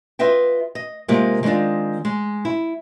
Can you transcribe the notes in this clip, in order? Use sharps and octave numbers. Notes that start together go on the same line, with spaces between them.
F4 B4 D#5 E5 G5
D#5
C3 G#3 A#3 F4 G4 A#4
D#3 G#3 C4 D4 F4
G#3
E4